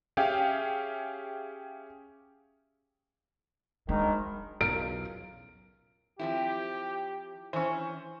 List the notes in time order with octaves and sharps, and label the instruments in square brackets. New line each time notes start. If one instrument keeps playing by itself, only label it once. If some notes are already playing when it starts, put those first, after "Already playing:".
[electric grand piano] C#4 G4 G#4 E5 F5 G5
[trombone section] G#1 D#3 [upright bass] G#3 D4
[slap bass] B1 E2 C#3 [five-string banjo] F4 A#4 [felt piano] D7
[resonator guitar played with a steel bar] F3 C4 E4 [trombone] G4
[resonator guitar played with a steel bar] E3 C#4 [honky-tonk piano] C5 C#6